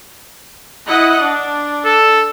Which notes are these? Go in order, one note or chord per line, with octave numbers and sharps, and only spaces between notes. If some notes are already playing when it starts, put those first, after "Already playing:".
E4 D#5 F#5
D4
A4